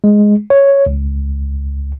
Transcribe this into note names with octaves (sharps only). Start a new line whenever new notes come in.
G#3
C#5
C#2